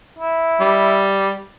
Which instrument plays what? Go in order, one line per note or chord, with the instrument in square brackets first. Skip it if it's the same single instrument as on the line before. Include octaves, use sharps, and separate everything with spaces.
[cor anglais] E4
[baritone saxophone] G3